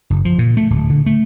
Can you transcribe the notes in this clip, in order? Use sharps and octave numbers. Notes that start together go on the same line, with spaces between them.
F#1
F3
A#2
A3
D1
D3
A3